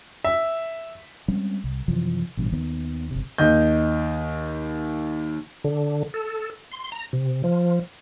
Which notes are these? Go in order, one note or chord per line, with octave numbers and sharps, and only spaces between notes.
E5
G3 G#3 C4 C#4
C2
F#2 C3 E3 F3
A1 G2 B2
D#2 D#3 B3
G1 C3
D#2 D#5 G6
D3
A4
C6
A#5
C3
F3